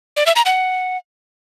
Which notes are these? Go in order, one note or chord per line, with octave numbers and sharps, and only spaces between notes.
D5
E5
A#5
F#5